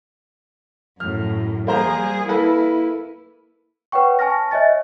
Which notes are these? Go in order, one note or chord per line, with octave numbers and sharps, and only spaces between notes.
F#2 A2 F6
G3 A#3 G#4 C5 A#5
A#3 E4 A4 B4
B4 C#5 F#5 G5 C#6
G#5 A5 C#6 F6 A#6
C#5 D#5 E5 G#5 A6